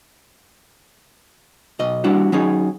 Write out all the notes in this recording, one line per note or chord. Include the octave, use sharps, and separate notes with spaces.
B1 D#5
G3 D4 E4 F#4
F#3 C#4 D#4 G#4